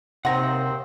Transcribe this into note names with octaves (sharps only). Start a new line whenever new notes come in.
D#2 C3 D#3 C4 E5 F#5 A#5 C6